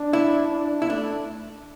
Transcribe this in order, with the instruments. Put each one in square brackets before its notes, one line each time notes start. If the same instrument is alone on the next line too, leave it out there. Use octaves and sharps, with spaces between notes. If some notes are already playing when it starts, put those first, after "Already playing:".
Already playing: [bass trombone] D4
[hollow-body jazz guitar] E4
[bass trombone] D4
[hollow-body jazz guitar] E4
[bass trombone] A3 [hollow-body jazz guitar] D4